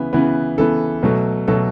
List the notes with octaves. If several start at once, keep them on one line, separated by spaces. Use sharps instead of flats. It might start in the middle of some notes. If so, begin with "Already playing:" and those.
Already playing: C#3 E3 B3
C#3 E3 B3
C#3 E3 B3 A4
B2 F#3 A3
B2 F#3 A3 A4